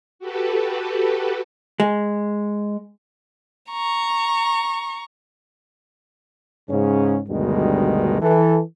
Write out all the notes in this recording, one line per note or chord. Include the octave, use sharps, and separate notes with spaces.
F#4 G4 A4 B4
G#3
A#5 C#6
G#2 C#3 C#4
D2 G2 B2 D#3 G3 G#3
E3 A4